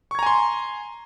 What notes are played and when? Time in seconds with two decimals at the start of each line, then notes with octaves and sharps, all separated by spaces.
0.11 C#6
0.15 G#6
0.19 A#5
0.23 G#5
0.26 C6